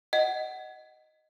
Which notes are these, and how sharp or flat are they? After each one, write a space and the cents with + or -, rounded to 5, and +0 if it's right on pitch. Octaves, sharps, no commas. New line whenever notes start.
D#5 +0 F#5 +20